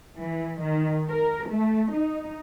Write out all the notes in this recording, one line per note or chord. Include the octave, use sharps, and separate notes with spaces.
E3
D#3
A#4
A3
D#4